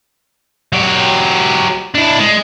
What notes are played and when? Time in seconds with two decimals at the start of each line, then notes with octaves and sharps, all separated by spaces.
0.73 F#3 G4
1.95 D4 E4
2.19 G#3